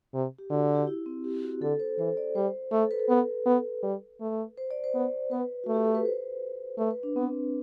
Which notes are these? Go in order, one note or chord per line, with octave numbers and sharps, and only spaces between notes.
C3
G4
D3 F#4
G4
E4
C4
G4
F#4
D3 A4
C5
E3 C5
D5
G3 C5
A3
A4
B4
A4
B3 B4
B3
G3
A3
C5
D5
C5
B3
B3 B4
A3 F#4
G4
A4
B4
C5
A3 B4
B4
D4
B3 C4